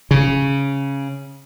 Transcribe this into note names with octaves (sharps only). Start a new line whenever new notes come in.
C#3